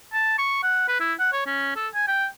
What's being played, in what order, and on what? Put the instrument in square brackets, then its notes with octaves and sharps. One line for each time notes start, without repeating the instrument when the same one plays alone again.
[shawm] A5
C#6
F#5
B4
E4
F#5
C#5
C#4
A4
G#5
G5